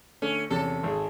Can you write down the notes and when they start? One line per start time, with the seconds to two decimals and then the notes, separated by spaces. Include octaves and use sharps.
0.22 D3 A3 C#4
0.50 E2 C3 C#4 A4
0.83 G#1 G#4